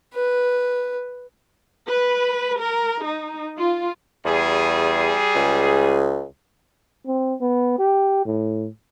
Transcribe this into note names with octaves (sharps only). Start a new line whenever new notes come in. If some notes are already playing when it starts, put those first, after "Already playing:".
B4
B4
A#4
D#4
F4
E2 G3 G#4
C#2
C4
B3
G4
A2